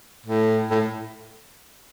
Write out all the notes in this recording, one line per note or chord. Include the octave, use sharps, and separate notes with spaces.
A2
A2